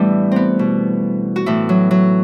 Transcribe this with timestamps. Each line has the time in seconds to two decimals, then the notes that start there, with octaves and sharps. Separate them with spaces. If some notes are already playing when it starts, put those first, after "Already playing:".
Already playing: A2 E3 G3 A3 B3 D4
0.32 B3 C4
0.59 B2
1.36 F#4
1.46 A2 E3 E4
1.69 F#3
1.91 F#3